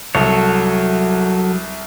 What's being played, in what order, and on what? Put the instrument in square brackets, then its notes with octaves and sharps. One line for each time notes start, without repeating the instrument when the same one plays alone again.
[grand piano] C2 [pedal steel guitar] F#3 A4 C#5